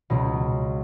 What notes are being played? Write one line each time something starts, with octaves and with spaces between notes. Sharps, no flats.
C#2 B2